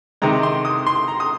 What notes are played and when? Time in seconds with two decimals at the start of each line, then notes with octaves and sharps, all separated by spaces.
0.22 C3 D#3 G#3 A#5
0.43 C6
0.65 D#6
0.87 C6
1.08 A#5
1.20 D#6